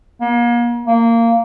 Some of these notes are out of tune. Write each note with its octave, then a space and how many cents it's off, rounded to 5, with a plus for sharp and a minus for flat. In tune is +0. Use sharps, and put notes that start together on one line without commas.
A#3 +40
A#3 -15